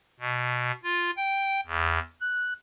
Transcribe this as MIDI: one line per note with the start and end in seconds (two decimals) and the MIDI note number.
0.20 0.71 47
0.84 1.11 65
1.17 1.61 79
1.67 1.99 40
2.21 2.53 90